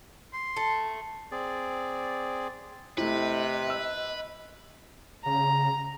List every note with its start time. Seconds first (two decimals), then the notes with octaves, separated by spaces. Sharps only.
0.33 C6
0.57 A3
1.32 C4 G#4 D5
2.98 C3 A3 E4 B4 D#5
3.66 E5 E6
5.26 C#3 A#5